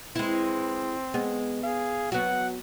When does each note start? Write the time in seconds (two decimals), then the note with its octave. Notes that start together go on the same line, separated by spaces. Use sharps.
0.15 G#3 C4 E4 B4
1.14 G#3 B3
1.63 G#4 F5
2.12 F#3 B3 F#4 F#5